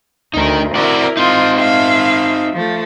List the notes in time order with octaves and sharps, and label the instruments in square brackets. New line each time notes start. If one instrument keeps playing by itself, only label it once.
[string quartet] D2 [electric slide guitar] D#4 A#4
[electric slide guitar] C4 F#4 D5 [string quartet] E4 A#4
[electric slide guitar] C4 D#4 [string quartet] F4
[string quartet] E5 F5
F3 A3